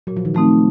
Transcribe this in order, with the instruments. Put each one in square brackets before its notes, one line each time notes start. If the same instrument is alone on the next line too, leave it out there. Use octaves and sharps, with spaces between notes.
[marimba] A#2 [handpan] F#3
[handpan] F3
D#3
[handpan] F3 [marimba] A3 C4 D#4